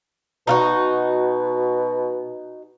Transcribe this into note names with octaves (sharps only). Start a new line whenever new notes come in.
B2 D#4 F4 F#4